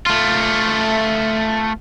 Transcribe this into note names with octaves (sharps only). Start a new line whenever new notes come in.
A3 F4